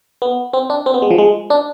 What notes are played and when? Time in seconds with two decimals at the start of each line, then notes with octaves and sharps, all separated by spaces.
0.22 B3
0.53 C4
0.70 D4
0.86 C4
0.94 B3
1.02 G#3
1.11 F3
1.18 G#3
1.50 D4